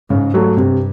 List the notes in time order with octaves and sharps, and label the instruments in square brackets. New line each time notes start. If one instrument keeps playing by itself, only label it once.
[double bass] G#2 [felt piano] C#3
[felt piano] F#3 A3
[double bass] G2 [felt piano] C3